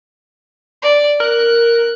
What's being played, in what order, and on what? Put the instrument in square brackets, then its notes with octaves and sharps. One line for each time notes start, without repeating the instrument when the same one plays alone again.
[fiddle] D5
[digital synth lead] A#4 [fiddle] F#6